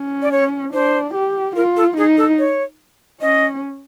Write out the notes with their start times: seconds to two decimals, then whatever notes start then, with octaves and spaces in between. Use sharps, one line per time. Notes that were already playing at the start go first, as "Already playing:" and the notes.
Already playing: C#4
0.22 D5
0.32 C#5
0.73 D4 C5
1.14 G4
1.56 F4 A#4
1.77 A4
1.97 D#4 G#4
2.17 A4
2.39 C#5
3.21 C#4 D#5